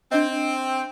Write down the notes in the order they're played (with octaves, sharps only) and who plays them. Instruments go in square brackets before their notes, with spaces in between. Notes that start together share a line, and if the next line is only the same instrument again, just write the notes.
[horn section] C4 [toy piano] D4 D#5